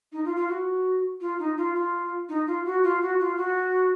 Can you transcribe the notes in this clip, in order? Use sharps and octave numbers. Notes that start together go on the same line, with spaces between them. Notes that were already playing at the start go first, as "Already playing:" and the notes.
D#4
F4
F4
F#4
F4
D#4
F4
F4
D#4
F4
F#4
F4
F#4
F4
F#4